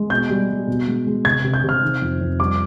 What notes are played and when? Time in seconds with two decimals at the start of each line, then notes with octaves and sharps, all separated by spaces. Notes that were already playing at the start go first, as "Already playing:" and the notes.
Already playing: G#3
0.10 B2 G6
0.30 G3
0.49 G3
0.67 B2
0.87 G#3
1.07 G#3
1.25 C3 G#6
1.44 C3
1.54 G6
1.64 C3
1.69 F6
1.83 D#3
2.02 F2
2.21 F2
2.40 G3 D6